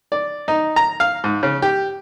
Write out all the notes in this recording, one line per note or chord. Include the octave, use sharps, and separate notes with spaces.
D5
D#4
A#5
F5
G#2
C#3
G4